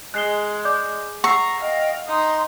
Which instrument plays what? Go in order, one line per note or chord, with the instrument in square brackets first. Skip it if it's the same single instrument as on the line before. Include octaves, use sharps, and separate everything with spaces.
[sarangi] G#3 [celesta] F#6 C7 G7
[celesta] D5 D6 G6
[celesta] F#5 E6 C7 [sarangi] A#5 [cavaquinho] C#6
[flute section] D#5 G5 [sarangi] F5
[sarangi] D#4 [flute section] A#5 C6 D#6